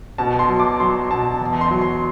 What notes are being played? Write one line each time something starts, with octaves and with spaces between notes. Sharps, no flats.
B2 A5
C6
F#3
D6
F#3 C6
B2 A5
E2
C6
F#3
C6